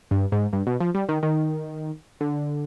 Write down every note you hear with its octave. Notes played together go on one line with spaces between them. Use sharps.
G2
G#2
G2
B2
F3
G3
D#3
D#3
D3